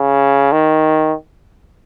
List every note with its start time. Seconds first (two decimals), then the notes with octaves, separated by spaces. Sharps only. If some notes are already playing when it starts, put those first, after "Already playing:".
Already playing: C#3
0.52 D#3